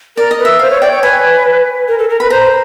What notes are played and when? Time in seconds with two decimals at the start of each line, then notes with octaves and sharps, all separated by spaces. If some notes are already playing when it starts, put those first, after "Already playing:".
0.17 A#4 D5
0.31 D#5
0.39 B4
0.45 E5
0.59 C5 F5
0.70 C#5
0.82 D5 G5
0.92 C#5
1.03 B4 G#5
1.88 A#4
1.98 A4
2.09 A#4
2.20 B4 B5
2.30 C5 A#5